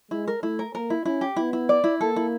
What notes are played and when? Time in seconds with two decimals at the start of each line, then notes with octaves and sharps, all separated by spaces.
0.11 G#3 E4
0.27 A#4
0.43 A3 E4
0.59 A#4
0.74 A#3 A#4
0.90 E4
1.05 C#4 E4
1.21 G4
1.36 B3 E4
1.53 E4
1.69 D5
1.84 E4
2.01 A#3 A4
2.16 E4